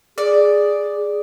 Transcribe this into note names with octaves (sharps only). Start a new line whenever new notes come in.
G#4 D5